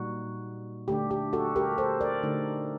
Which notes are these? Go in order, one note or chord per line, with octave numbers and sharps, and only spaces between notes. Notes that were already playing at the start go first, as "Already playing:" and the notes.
Already playing: A#2 G3 A#3 D#4 F#4
D3 A3 D4 G4
G4
F#4 A4
G4 A#4
A4 C5
A#4 D5
D3 A3 D#4